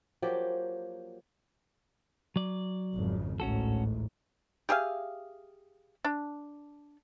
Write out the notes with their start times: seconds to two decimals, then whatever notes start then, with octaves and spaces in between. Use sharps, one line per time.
0.22 F3 F#3 A#3 G4
2.36 F#3 D5
2.94 G#1 F2 C#3
3.40 A1 D2 G#2 C#4 F#4 A4
4.69 G4 G#4 E5 F5
6.05 D4